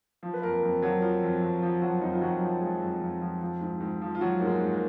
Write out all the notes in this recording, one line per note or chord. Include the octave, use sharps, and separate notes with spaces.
F3
B4
F2 A#3 A#4
F2
F3 F#3 F#4
F3 F4
F2
F2
F3
F3 F#3 F#4
F2 D#4
F4
F2 F#3 F#4
F3
F3 G#3 G#4
F2
F2
F3
F3
G#2
G#2
F3
F4
F3 F#3 F#4
G#2 A#3
G#3
G#2
A#3